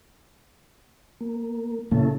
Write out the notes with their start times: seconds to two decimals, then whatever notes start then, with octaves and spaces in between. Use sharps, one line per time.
1.21 A#3
1.91 A#2 C#3 A#3 C#4 E4 A4